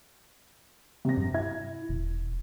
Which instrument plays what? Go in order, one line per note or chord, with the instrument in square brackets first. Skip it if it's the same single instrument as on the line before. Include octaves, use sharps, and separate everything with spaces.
[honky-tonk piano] C3 A#6
[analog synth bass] G2
[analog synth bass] E4 [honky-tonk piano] G#6
[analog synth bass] E1